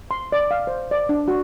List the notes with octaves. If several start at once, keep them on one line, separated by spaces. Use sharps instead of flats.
C6
D5
F5
C5
D5
D4
F#4